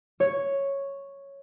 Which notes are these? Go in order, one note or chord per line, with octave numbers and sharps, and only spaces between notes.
C#5